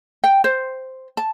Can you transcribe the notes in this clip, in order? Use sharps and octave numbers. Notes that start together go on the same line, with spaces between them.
G5
C5
A5